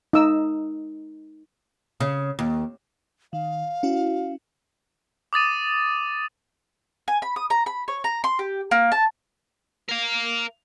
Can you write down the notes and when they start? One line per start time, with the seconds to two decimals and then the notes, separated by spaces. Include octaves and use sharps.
0.13 D#4 E6
2.00 C#3
2.39 D#2
3.33 D#3 F5
3.83 C#4 E4 F#4
5.33 D6 D#6 A6 D#7
7.08 G#5
7.22 B5
7.36 D#6
7.50 A#5
7.66 B5
7.88 C#5
8.04 A#5
8.24 C6
8.39 G4
8.71 A#3
8.92 A5
9.89 A#4 F5